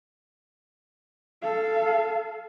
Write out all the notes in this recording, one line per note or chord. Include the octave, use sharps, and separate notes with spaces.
A4 F5